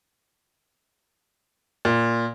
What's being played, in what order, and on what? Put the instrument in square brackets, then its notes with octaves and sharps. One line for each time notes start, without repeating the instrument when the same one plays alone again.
[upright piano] A#2